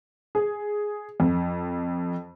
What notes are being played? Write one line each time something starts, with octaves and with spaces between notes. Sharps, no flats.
G#4
F2